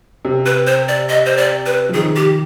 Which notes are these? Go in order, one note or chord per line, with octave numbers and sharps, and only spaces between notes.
C3
B4
C5
D5
D#5
C5
D5
B4
F3
D#3 G#4
G4